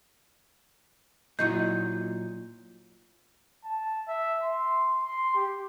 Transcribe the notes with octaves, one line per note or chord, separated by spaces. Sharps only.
A#2 F#3 D#4 E4 D#5 G6
A5
E5
C6
C6
G4